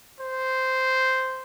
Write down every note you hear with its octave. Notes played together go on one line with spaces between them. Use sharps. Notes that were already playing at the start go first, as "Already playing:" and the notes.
C5